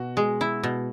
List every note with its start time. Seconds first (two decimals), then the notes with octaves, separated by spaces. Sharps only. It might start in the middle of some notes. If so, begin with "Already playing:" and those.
Already playing: B2 F#4
0.17 G#3
0.41 E4
0.63 B2